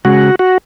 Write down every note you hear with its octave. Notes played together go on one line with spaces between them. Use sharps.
C#3 G#3 C#4 F#4 G#4
F#4